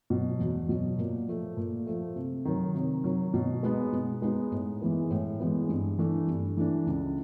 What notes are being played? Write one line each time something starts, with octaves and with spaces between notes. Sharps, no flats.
B2 F#3
E2
B2 F#3
A#2
F3 A3
A#2
F3 A3
C3
D#3 F#3
C3
D#3 F#3
B2
G#3 B3 D#4
B2
G#3 B3 D#4
A2
E3 G#3 B3
A2
E3 G#3 B3
G2
E3 A3 D4
G2
E3 A3 D4
C#2